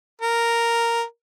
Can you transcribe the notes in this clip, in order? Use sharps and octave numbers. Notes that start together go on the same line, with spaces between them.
A#4